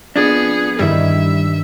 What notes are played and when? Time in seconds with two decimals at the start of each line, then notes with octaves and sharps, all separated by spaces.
0.16 F2 F3 B3 D4 G#4
0.79 G2 D#3 G3 E4 E5